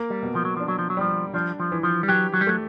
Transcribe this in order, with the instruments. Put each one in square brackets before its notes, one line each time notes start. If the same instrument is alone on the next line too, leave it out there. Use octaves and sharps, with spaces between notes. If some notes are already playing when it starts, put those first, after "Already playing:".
Already playing: [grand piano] A#3
[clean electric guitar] G3
[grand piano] B2
[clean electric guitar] F3
F#3
[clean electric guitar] F3 [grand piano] D4
[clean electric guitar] F#3
F3
F#3
[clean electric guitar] F3 [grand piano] G3
[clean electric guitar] F3 [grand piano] D4
[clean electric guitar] F3
[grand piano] E3
[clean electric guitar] F3
G3
[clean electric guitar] F#3 [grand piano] G4
[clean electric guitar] F#3
G3
[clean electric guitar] F#3 [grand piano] A3